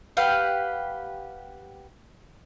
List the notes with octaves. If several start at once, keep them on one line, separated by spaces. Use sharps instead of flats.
G4 B4 F5 F#5